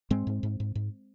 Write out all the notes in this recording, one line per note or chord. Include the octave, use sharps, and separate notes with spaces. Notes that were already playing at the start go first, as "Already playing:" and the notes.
G#2 G#3 C4
G#2
G#2
G#2
G#2